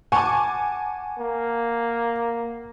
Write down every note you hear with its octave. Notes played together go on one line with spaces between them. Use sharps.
F#5 G#5 A5 C#6 D6
A#3